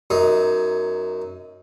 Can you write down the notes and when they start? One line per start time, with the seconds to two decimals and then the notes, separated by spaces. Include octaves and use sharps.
0.10 F#2 D#4